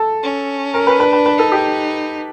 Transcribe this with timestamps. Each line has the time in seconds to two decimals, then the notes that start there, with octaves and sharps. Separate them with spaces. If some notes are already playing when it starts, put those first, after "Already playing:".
Already playing: A4
0.23 C#4
0.74 A#4
0.87 B4
0.99 D4 B4
1.13 B4
1.26 B4
1.38 D#4 A4
1.52 G4